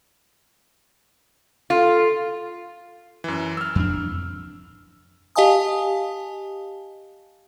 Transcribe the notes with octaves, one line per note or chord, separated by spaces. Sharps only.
F4 A4
F#2 E3
E6 F6
F2 D4
G4 D#5 F5 G#5 A5 D#6